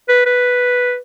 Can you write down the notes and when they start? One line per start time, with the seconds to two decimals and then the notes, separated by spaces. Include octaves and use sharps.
0.09 B4
0.26 B4